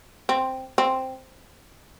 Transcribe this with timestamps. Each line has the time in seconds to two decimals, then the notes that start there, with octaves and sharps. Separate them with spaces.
0.29 C4
0.78 C4